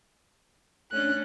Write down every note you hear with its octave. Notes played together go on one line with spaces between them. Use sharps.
A3 C#4 D4 F#6